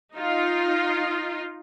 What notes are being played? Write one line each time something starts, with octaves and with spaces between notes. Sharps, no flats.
D#4 F4